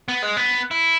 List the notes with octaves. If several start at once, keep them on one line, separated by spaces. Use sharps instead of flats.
B3
G#3
B3
E4